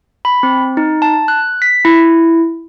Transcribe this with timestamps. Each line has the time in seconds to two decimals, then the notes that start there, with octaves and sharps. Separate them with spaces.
0.25 B5
0.43 C4
0.77 D#4
1.02 A5
1.28 F#6
1.62 B6
1.85 E4